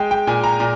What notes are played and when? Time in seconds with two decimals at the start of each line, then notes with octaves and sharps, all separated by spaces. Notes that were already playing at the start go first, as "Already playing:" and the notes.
Already playing: G#3 G5
0.11 G5
0.27 A#2 G#5
0.44 A#5
0.60 A#2